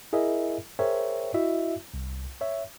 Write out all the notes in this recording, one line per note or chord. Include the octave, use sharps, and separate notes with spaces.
E4 G#4 A#4 D#5 E5
G#4 A#4 C5 C#5 E5 G5
E4 F#4 D#5 E5
C2
C#5 E5